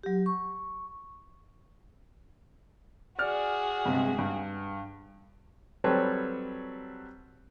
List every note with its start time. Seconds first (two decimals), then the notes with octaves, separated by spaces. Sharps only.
0.03 F#3 G4
0.26 C#6
3.19 F#4 G#4 D5 F6
3.85 G2 C3 G#3
4.19 G2
5.84 F#3 G3 C4 A4 B4 C#5